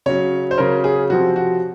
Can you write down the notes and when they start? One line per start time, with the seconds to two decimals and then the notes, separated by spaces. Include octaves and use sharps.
0.06 C#3 F#3 C#4 C#5
0.51 C5
0.58 C#3 F#3 C#4 A#4
0.84 G#4
1.10 C3 F3 C4 F#4
1.36 F#4